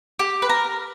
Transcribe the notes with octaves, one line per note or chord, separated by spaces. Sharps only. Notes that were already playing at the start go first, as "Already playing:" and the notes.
G4
B4
A#4